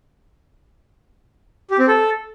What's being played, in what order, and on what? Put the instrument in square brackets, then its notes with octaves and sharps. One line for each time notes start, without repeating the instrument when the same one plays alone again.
[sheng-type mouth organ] G4
C4
A4